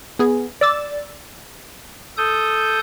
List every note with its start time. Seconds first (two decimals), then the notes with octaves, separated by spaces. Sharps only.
0.19 B3 G#4
0.61 D5 E6 A6
2.17 A4 D#6 G6